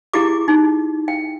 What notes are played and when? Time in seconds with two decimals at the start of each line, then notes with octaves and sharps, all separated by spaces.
0.13 E4 G4 G#4 D6
0.48 D#4
1.08 G5